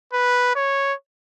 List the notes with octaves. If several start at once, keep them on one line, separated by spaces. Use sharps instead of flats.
B4
C#5